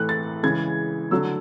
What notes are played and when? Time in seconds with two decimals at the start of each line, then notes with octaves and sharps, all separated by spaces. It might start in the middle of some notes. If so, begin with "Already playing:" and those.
Already playing: A2 E3 A3 F#6
0.09 A6
0.43 C#3 E3 G#3 G#6
1.11 D3 F#3 A3 E6